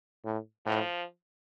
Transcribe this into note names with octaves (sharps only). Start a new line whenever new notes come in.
A2
A2 F3